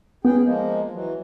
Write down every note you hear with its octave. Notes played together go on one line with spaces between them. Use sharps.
B3 C#4 G#4 G5
F3 G#3 A#3
E3 F#3